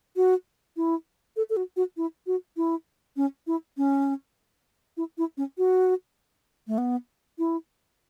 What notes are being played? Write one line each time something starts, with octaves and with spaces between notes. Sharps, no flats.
F#4
E4
A4
A4
F#4
F#4
E4
F#4
E4
C#4
E4
C#4
E4
E4
C#4
F#4
A3
B3
E4